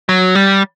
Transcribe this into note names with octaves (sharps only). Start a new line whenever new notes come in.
F#3
G3